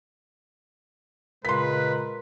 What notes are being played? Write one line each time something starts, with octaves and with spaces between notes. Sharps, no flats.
A#2 C#3 G#3 A#4 B4 C6 B6